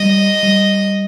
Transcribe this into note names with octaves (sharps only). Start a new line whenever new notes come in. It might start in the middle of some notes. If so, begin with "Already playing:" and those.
Already playing: G3 D#5
G3